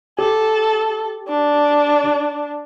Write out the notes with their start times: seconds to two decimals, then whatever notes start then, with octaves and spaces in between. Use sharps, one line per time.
0.19 G4 A4
1.28 D4